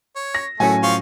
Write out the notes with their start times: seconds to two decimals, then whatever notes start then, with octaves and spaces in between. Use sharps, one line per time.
0.16 C#5
0.35 A#6
0.60 A2 F#3 A3 C#4 F#5 G#5
0.83 F3 F5 C#6